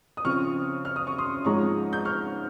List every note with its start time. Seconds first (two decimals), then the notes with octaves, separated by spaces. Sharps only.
0.17 D#6
0.25 C#3 F3 C4 C#6 F6
0.85 F6
0.96 D#6
1.07 C#6
1.18 C6 D#6
1.45 G#2 F3 G#3 C#4 A#5 C#6
1.93 G6
2.05 C#6 F6